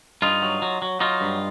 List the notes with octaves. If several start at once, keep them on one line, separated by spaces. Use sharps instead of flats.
G2 D#4 F4
F#3
F#3
F#3
F#3 D#4 F4
G2